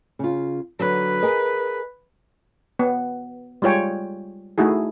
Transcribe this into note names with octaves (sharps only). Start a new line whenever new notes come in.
C#3 F4
D3 F#3 B4
G#4 A#4 D#5
B3
G3 G#3 F4 C#5 G5 G#5
A3 D#4 E4 F#4 G#4